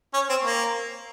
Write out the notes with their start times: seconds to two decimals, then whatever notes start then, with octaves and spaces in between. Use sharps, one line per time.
0.14 C#4
0.29 C4
0.45 A#3